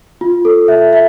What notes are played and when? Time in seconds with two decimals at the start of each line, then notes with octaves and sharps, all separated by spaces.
0.21 F4
0.45 A4
0.68 E5
0.93 E5